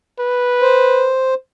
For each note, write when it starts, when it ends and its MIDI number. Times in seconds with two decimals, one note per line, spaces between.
0.19 1.12 71
0.62 1.34 72